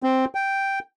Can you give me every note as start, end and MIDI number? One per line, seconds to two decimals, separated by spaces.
0.03 0.25 60
0.35 0.79 79